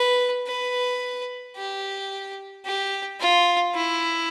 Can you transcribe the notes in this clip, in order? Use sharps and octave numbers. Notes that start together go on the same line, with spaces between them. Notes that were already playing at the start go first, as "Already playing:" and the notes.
Already playing: B4
B4
G4
G4
F4
E4